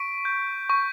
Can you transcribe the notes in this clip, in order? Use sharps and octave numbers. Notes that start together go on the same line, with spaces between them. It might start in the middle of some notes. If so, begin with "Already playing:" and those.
Already playing: C#6 B6 D7
G6
C#6